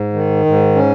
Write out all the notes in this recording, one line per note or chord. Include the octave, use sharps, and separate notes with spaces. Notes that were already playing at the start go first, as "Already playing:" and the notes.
Already playing: G#2
D#3
G#2
C#4